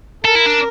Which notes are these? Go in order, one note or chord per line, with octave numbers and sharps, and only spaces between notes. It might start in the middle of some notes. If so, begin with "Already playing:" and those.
A4 A#4
E4
D4